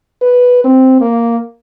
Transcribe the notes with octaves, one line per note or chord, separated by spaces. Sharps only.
B4
C4
A#3